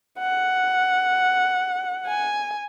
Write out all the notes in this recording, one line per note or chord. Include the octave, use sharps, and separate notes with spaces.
F#5
G#5